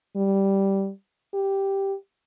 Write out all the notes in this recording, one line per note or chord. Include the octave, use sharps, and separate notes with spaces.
G3
G4